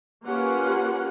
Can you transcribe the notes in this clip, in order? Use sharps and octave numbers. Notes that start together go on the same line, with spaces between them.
A#3 C#4 F4 G4 B4 F#5